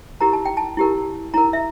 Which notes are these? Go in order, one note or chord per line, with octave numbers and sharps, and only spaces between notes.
E4 G4 A#4 A#5
A5
G5
A5
E4 G4 A#4
E4 A#4 A#5
E5